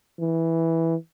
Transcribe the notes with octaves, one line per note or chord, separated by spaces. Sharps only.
E3